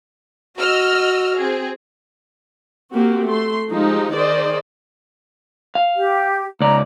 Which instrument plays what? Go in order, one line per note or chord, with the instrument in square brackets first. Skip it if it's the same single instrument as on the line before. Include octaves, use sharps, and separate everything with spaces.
[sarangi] F#4 [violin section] D#5 E6 F6
[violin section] C4 G#4
[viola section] A#3 C4 F#4 G4
A3 C6
F3 G#3 D#4 G4
D#3 G#4 C5 D5 D#5
[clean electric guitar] F5
[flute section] G4
[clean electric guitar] C#2 D5 [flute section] A#5